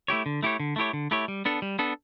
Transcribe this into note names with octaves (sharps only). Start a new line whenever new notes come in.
A3 E4 G4 C#5
D3
A3 E4 G4 C#5
D3
A3 E4 G4 C#5
D3
A3 E4 G4 C#5
G3
B3 D4 A4
G3
B3 D4 A4